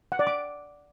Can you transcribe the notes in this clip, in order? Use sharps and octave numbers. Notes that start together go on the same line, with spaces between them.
F#5
D5
D6